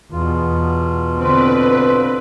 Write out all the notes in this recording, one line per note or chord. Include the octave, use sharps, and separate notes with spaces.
E2 B2 F4
D3 C4 B4